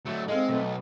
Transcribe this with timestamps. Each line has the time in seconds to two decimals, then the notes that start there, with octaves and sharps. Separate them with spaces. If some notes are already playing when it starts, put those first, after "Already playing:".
0.06 D3 F#3 A3
0.28 G#3 C4 D#4 A4 F5
0.49 B1 A3 D#4 B4